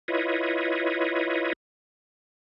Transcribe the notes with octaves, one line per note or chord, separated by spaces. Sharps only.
E4 F4 B4 C#5 D#5